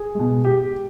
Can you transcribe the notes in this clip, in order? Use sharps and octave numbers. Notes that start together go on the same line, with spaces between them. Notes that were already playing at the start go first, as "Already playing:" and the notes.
Already playing: G#4
B2 G#3
G4